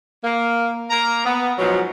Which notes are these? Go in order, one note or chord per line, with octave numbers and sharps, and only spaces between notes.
A#3
A#3 A#5
B3
G#2 B2 F3 F#3